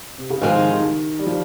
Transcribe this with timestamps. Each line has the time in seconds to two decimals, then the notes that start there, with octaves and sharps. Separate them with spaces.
0.18 C3
0.30 C#3
0.41 G#2 D#3 F3 G#3 C4 D#4
0.56 D#3
0.70 D#3
1.19 G3
1.27 F3